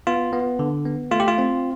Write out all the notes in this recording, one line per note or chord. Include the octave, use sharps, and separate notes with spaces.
B3 F4
B3
D3
B3
A3 F4
G4
F4
C4